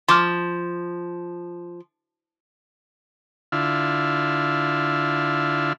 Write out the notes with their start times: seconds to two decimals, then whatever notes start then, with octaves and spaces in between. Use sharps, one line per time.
0.09 F3 C6 D6 F6
3.52 D3 E4 F4